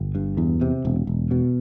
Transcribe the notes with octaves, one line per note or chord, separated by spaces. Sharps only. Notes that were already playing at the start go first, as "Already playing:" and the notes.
Already playing: G1
G2
E2
C3
E1
E1
B2